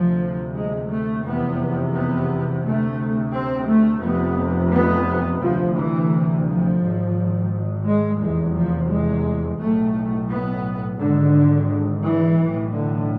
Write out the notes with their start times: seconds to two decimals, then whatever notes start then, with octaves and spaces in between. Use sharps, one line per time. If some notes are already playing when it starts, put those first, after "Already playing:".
Already playing: D2 C3 F3
0.54 G#3
0.89 A3
1.24 F1 E2 C3 B3
1.93 B3
2.63 D2 C3 A3
3.33 C4
3.68 A3
4.02 F1 F2 C3 B3
4.72 B3
5.41 D2 C3 F3
5.76 E3
6.46 F3
6.81 G#1 G#2
7.85 G#3
8.20 F1 E2 C3 G#3
8.55 F3
8.90 G#3
9.59 B1 A2 A3
10.28 B3
10.98 G#1 G#2 D3
12.03 E3
12.38 B1 A2
12.72 D3